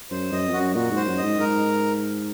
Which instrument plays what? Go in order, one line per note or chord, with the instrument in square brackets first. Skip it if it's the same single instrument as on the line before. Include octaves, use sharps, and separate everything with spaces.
[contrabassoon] F#2 [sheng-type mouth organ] C5
[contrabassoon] F#2 [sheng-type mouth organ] D#5
[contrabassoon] F2
[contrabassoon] F#2 [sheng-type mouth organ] F#4
[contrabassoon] A#2 [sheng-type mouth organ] F#4
[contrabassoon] G#2
[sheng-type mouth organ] C5
[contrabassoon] F#2
[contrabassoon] G#2 [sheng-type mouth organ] D#5
[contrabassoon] G#2 [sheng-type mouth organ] A#4